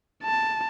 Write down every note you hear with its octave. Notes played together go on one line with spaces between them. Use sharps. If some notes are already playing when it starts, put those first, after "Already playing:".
A5